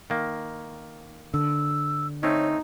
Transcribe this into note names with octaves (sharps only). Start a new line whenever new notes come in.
D#3 A#3
D3 E6
A3 C4 C#4 D#4 C#5